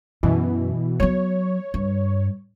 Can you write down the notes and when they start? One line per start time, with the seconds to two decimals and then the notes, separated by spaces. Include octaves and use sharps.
0.23 F#2 B2 E3
1.00 F#3 B3 C#5
1.74 G2